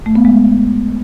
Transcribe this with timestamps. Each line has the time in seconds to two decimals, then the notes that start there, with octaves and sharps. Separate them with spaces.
0.06 A3
0.15 B3
0.25 G#3